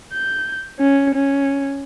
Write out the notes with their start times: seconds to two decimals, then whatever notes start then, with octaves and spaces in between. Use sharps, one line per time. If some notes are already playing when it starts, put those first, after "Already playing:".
0.13 G6
0.80 C#4
1.15 C#4